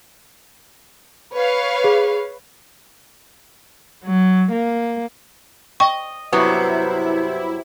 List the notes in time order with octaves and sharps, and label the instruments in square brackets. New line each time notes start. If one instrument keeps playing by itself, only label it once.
[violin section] B4 C#5 F5
[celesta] G#4
[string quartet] F#3
A#3
[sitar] D#5 [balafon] G5 C#6
[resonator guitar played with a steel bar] G2 F#3 B3 [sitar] C3 [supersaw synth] E4